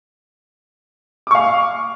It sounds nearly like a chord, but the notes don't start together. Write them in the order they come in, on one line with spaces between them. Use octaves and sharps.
D6 C#6 F5